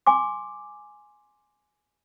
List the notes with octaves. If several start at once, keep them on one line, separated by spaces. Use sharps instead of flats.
G#5 C6 D6